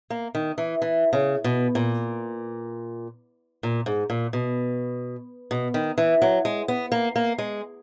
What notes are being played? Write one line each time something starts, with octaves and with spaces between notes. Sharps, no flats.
A#3
D#3
E3
E3
C#3
B2
A#2
A#2
G#2
A#2
B2
B2
D#3
E3
F#3
G#3
B3
A#3
A#3
G#3